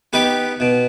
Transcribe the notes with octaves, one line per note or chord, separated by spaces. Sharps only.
B3 D#4 G4 B4
B2